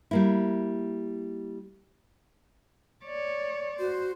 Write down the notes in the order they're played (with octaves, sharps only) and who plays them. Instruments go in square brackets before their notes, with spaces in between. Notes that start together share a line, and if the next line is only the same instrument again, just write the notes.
[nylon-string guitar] G3 A#3 E4
[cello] C#5 D5
[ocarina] F#4 [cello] C5